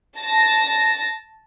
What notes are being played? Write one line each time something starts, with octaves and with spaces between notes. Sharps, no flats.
A5 A#6